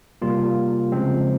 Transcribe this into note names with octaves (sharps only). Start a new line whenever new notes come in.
C3 G3 A#3 F4
C#3 F3 G#3 C4